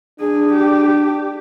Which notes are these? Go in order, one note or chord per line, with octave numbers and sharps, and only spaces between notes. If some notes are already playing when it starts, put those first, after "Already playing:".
D4 G#4
G4